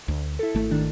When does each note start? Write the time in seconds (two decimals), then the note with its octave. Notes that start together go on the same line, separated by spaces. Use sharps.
0.08 D2
0.39 E4 A4
0.54 G#1 A3
0.71 D#3 D4